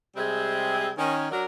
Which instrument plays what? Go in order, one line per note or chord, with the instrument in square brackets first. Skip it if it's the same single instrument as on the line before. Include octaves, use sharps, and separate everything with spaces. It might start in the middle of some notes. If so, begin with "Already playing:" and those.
[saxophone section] C3 G3 G#3 C4 G#4 E5
D#3 C#4
F#3 D4 A#4